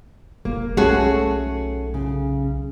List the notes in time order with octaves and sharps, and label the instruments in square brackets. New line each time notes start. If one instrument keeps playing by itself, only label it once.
[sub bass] F1 [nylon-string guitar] A#3
[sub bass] B1 [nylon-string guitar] A3 C#4 A4 [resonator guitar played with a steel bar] F#4 G#4
[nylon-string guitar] C#3